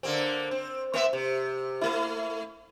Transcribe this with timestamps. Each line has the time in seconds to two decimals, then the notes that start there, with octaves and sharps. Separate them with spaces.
0.03 D3 A#3 C4
0.51 C4
0.94 A#3 C4 E5
1.13 C3
1.81 A3 E4